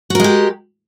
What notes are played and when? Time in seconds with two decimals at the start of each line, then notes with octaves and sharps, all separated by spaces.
0.10 F#4
0.15 A#4
0.20 G#3
0.24 G4